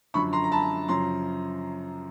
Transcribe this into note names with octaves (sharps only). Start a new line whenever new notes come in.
F#2 D3 F3 B5 C#6
A#5 C6
A#5
A5 B5
F#2 C#3 F3 A#5 C6